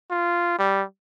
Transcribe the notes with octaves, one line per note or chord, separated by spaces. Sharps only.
F4
G3